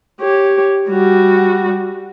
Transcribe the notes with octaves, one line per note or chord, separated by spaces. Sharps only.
G4 C#5
G3 F#4